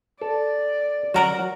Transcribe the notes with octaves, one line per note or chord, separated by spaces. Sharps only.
A4 D5
F#3 F#4 A#4 F#5